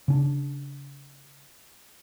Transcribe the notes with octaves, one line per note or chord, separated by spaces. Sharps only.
C#3 C#4 D4